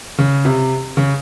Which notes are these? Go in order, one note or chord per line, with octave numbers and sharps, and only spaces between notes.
C#3
C3
C#3